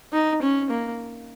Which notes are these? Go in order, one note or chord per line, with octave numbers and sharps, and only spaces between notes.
D#4
C#4
A#3